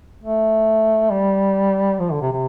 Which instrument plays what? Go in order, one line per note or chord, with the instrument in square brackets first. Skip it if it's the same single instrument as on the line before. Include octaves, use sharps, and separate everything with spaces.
[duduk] A3
G3
F3
D3
C3
C3